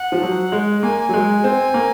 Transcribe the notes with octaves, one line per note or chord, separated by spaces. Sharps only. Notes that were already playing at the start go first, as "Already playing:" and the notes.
Already playing: F#5
F3
F#3
G#3
A#3 G#5
F#3
G#3
C4
A#3